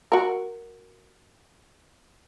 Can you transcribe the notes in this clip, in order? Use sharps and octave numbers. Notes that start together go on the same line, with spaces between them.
F#4 A#4